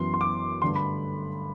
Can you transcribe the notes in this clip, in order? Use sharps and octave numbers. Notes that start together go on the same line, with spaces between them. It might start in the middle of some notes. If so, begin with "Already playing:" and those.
Already playing: F#2 E3 B3 C6
C6
D6
G2 D3 A3 C6
B5